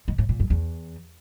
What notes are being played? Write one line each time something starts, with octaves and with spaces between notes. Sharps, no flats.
G#2
A2
A#2
F#2
E2